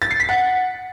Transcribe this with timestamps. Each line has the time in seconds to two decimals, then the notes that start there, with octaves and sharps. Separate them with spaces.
0.02 A6
0.11 C7
0.20 B6
0.29 F#5